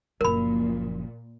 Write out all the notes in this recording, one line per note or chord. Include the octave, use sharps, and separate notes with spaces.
F#1 A#2 F3 A#4 B5